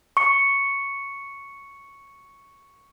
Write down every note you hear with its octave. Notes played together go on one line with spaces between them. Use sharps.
C#6 C#7